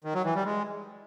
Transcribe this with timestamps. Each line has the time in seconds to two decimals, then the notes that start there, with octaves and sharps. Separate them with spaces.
0.04 D#3
0.15 F#3
0.25 E3
0.35 G3
0.45 G#3